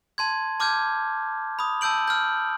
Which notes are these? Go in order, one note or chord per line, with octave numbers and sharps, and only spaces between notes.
A5 C6 G#6
A5 D6 F6 G6 G#6
B5 D#6
A5 E6 G6 D7 F#7
F6 G6